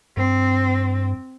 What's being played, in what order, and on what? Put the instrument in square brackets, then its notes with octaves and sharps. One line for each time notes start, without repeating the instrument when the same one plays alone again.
[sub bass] G2 [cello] C4